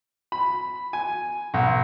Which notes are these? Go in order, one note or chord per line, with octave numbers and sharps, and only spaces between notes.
B5
G#5
B1